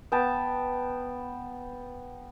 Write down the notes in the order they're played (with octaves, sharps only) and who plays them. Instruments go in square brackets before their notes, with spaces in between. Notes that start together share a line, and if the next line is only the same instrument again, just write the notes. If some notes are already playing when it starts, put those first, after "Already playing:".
[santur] B3 G5 A5